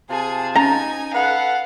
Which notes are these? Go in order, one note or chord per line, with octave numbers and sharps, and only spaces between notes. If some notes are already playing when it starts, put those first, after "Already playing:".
C3 F4 G#4 G#5 A5
C#4 D#4 G#5 A#5
A4 B4 F5 F#5